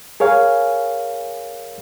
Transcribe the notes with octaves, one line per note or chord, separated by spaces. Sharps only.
G#4 A#4 C#5 F5 G#5